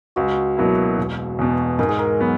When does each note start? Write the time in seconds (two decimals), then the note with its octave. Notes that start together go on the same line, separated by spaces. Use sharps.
0.16 C#2 F#4
0.57 B2 F#3 A#3 E4
0.98 E1
1.39 E2 B2
1.79 G#2 A#4
1.89 G#4
1.99 A#4
2.20 F#3 B3